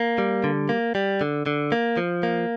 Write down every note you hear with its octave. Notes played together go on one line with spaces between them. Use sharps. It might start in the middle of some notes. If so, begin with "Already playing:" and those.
Already playing: A#3
G3
D3
A#3
G3
D3
D3
A#3
F3
A#3